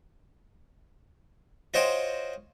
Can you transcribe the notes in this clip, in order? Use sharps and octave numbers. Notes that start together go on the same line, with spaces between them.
F4 F#4 C5 C#5 D#5 G5